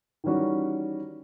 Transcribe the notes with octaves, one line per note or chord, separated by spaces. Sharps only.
D#3 E3 G3 C#4 F#4